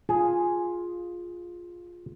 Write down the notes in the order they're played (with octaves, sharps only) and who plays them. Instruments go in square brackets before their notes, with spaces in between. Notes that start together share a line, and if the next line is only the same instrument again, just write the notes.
[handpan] F4 [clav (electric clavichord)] G#4